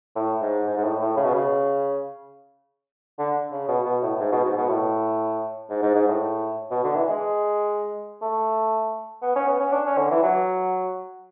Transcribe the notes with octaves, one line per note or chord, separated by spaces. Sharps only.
A2
G#2
G#2
G#2
A2
A2
C#3
B2
C#3
D3
C#3
B2
B2
A2
G#2
B2
G#2
B2
A2
G#2
G#2
G#2
A2
B2
D3
E3
G#3
A3
B3
C#4
B3
C#4
D4
C#4
D3
E3
F#3